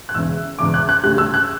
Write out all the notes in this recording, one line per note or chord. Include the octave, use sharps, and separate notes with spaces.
F#6
E1 E2 C#3 E3 E6
E1 E2 C#3 E3 D6
F#6
F#6
D2 C#3 G3 F#6
E6
F#6